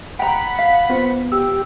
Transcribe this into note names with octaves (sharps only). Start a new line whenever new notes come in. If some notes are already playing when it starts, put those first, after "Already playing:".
F#5 G5 A#5 B5
F5 B6
B3 F4 C5
G4 E6